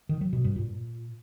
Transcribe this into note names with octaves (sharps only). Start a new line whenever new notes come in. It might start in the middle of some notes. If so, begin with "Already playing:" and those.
D#3
F#3
B2
G2
A#2